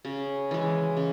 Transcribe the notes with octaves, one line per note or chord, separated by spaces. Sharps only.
C#3
E3 G#3
C#3